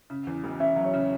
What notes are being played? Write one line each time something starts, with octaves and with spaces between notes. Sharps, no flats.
C#3
E2
E1
C#4 E5
F#3
C#5
C#3